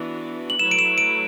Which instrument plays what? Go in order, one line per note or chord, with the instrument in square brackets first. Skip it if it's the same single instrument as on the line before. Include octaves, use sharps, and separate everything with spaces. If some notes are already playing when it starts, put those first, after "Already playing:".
Already playing: [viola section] E3 B3 D4 F#4
[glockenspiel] F#7
[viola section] F#3 A3 E4 B4 [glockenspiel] E7
[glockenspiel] D7
E7
D7